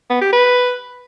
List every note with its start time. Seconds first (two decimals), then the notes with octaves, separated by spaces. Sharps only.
0.10 B3
0.21 G4
0.33 B4